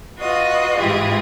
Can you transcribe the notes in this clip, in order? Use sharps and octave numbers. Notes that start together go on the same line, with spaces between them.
F4 F#4 B4 D#5
G#2 E3 F4 G4 G#4